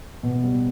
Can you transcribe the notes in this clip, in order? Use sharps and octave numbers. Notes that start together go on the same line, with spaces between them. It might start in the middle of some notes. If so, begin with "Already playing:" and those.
B2
G3